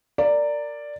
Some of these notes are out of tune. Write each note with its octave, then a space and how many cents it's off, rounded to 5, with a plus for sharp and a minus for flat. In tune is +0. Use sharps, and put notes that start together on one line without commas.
A#4 -15 D5 +0